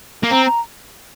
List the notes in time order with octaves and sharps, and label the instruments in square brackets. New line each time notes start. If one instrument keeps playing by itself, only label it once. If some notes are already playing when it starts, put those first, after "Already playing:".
[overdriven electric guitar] A#3
[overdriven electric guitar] C4 [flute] A#5
[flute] A#5